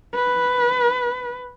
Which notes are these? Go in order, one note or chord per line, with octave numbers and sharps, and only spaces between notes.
B4